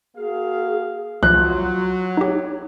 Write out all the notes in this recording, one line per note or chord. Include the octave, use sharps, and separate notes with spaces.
A#3 F#4 G#4 F5
C2 F3 F#3 F4 F#6
D#4 G4 C#5